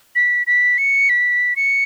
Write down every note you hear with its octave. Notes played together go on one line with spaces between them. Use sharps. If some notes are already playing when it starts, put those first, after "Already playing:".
B6
B6
C#7
B6
C#7